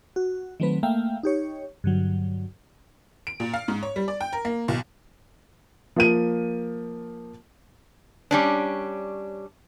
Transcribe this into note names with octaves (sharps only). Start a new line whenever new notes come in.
F#4
D#3 F#3 A3 C4 B4
A3 A#3 E5 F5 G5
D#4 G4 C#5
G2 D3 F#3
D7
A#2
F5
G#2
C#5
G3
D5
G5
A#4
A#3
B1
F3 A#3 D#7
G3 C#4 D4